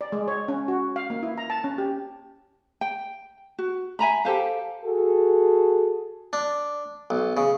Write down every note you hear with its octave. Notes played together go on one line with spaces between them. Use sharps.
D5
G#3
C#5
C#4
F#4
F5
A#3
E4
A#5
A5
C#4
G4
G5
F#4
E5 G#5 A#5 B5
G4 A4 C5 F5
F#4 G#4 A4
D4
B1
C#3